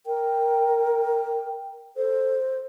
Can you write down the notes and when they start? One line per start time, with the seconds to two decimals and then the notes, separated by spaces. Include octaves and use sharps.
0.06 A#4 G5
1.97 A4 C5